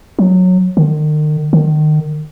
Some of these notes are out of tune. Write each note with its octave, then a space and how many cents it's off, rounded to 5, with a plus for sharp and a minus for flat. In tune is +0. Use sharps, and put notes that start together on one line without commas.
F#3 -15
D#3 -40
D#3 -30